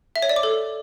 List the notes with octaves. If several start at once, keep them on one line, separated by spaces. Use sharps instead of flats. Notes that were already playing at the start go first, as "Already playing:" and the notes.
E5
C#5
D5
D6
A4